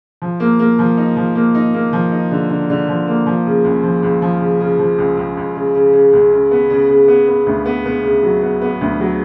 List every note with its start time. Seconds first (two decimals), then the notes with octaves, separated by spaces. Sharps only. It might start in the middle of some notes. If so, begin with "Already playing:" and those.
0.22 F3
0.40 A#3
0.59 A#3
0.79 F3
0.97 D#4
1.17 F3
1.35 A#3
1.55 D#4
1.74 A#3
1.93 F3
2.12 D#4
2.31 D3
2.50 D3
2.70 D3
2.89 F3
3.07 A#3
3.26 F3
3.46 C#3
3.64 C#2
3.83 F3
4.03 C#2
4.22 F3
4.41 C#3
4.60 C#3
4.79 F3
4.98 C#2
5.17 C#2
5.37 C#2
5.56 C#3
5.75 C#3
5.93 C#3
6.13 C#2
6.33 C#3
6.51 B3
6.70 C#3
6.89 C#3
7.08 B3
7.28 B3
7.47 D2
7.66 B3
7.86 B3
8.04 C#3
8.23 F#3
8.42 B3
8.62 B3
8.81 D2
9.00 F#3